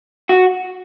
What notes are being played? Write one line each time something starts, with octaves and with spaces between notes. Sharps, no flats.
F#4